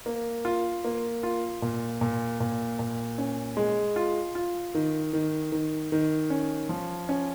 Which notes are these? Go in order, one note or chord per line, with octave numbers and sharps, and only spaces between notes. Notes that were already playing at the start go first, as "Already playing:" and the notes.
A#3
F4
A#3
F4
A#2
A#2
A#2
A#2
C#4
G#3
F4
F4
D#3
D#3
D#3
D#3
C#4
F3
C#4